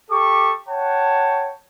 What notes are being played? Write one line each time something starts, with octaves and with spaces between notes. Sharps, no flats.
G4 A4 C#6 D6
C#5 F#5 G5 A5